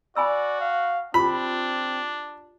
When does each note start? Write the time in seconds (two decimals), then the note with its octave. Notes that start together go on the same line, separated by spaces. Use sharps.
0.16 F#4 D5 G#5 B5 E6
0.61 F5
1.14 C4 D4 F4 G4 B5